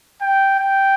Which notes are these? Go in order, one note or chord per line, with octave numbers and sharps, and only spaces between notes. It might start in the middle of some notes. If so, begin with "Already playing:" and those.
G5
G5